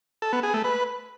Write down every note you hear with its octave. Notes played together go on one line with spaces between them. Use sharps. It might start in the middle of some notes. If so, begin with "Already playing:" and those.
A4
B3
G#4
A3
B4